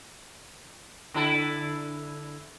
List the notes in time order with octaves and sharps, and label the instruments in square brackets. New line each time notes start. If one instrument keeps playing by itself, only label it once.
[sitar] D3 E4 A4